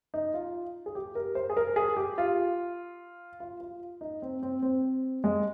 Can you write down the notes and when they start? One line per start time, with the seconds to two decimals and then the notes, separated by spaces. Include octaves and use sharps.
0.14 D#4
0.34 F4
0.86 G#4
0.95 G4
1.15 A#4
1.35 C5
1.50 G#4
1.57 A#4
1.76 G#4
1.97 G4
2.18 F4
3.40 F4
3.60 F4
4.01 D#4
4.22 C4
4.43 C4
4.62 C4
5.24 G#3